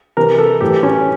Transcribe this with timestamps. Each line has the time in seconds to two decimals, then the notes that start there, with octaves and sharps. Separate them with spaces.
0.17 C3 E3 A#4
0.38 A4
0.61 A2 E3 G4
0.83 C#4